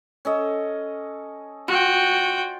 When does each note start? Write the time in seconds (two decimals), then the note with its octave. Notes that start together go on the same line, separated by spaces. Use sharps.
0.25 C#4 A4 D#5
1.68 F4 F#4 G5